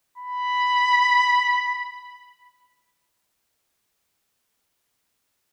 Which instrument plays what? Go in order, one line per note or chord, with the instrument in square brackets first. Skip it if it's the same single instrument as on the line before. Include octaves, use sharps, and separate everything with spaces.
[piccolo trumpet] B5